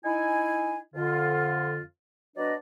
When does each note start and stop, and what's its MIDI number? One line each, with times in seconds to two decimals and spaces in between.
0.05 0.77 63
0.05 0.77 64
0.05 0.77 80
0.95 1.81 41
0.95 1.81 50
0.95 1.81 65
2.36 2.54 54
2.36 2.54 59
2.36 2.54 62
2.36 2.54 71
2.36 2.54 74
2.36 2.54 75